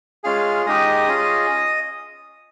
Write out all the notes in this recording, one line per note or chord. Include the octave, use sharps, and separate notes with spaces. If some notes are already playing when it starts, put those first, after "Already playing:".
G#3 C#4 F4 G#4 F5 F6
G#3 D#4 G4 D#5 D#6
C#4 F4 G#4